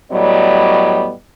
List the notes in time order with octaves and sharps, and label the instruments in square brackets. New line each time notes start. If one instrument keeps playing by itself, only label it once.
[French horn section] A2 F#3 G3 B3 D5 D#5